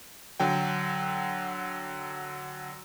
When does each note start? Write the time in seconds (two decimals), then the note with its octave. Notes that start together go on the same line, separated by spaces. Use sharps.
0.40 D3 F#3 G5